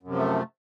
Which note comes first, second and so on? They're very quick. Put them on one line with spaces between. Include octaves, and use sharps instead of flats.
F#2 C3 F3 A3